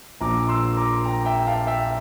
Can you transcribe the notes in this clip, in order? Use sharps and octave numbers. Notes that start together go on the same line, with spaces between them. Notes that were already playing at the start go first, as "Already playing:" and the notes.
A#1 A#2 F3 A#5 D6
C6 E6
A#5 D6
G5 A#5
E5 G5
F5 A5
E5 G5